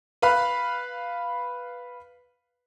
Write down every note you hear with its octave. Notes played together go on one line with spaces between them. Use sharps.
B4 F5 B5